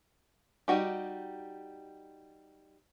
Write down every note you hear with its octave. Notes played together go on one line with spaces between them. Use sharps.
G3 D#4 F#4 G4